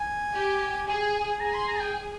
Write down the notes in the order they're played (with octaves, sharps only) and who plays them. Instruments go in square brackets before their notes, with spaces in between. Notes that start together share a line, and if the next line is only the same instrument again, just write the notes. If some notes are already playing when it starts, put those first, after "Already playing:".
Already playing: [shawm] G#5
[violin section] G4
[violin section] G#4 [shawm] G#5
[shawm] G#5
G#5
[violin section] G#4 [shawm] A#5
[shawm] C6
A#5
G5